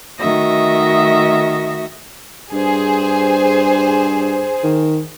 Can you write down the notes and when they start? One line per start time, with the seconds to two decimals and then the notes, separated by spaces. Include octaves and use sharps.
0.19 D#3 A3 F#4 D#5 E5 A#6
2.52 G2 G#4 C5
4.63 D#3